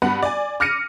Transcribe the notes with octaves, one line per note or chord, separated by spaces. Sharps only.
G2 B3 F#5 B5
D5 G#5
D6 F6 A#6 C#7 D#7